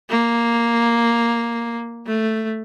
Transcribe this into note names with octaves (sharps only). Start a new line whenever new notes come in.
A#3
A3